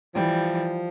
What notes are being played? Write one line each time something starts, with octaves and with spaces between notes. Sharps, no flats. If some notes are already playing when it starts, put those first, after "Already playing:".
E3 F3 G3